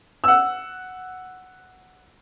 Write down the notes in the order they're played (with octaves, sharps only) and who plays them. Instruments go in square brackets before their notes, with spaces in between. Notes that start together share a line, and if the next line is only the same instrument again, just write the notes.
[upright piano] F#5 E6